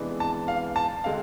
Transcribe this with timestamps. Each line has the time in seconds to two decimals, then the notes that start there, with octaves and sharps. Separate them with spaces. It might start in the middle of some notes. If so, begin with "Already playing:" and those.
Already playing: C3 E3 G#3 B3 D4
0.20 A5
0.48 F5
0.76 A5
1.04 D3 G#3 C4 F5